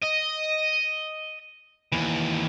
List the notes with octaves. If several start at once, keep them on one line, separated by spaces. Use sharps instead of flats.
D#5
D#2 E3